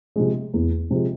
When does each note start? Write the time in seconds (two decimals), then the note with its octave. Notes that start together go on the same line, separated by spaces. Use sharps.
0.16 C3 F3 G#3
0.54 E2
0.90 C3 F3 G#3